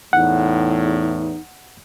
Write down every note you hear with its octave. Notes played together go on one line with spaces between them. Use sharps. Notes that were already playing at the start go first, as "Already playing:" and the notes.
E2 A2 D#4 F#5